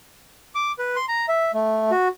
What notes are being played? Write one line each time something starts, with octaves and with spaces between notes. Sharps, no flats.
D6
B4
C6
A#5
E5
A3
F#4